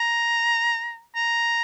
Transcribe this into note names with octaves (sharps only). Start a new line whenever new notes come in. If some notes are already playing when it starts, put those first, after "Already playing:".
Already playing: A#5
A#5